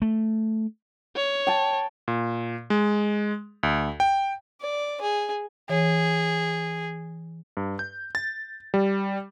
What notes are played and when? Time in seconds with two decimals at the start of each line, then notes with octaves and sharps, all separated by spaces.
0.02 A3
1.16 C#5
1.47 G5 A5
2.08 A#2
2.70 G#3
3.63 D2
4.00 G5
4.61 D5
5.01 G#4
5.69 E3 G#4 C#5
7.57 G2
7.79 G6
8.15 A6
8.74 G3